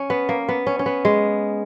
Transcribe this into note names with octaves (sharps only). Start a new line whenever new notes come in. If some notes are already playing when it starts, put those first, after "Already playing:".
Already playing: C#4
B3
A#3
B3
C#4
C#4
B3
G#3